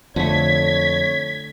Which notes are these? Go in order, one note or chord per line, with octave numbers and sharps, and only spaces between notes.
F2 D3 A3 C#5 G#6 B6